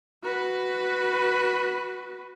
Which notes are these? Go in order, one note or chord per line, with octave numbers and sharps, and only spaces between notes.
F#4 B4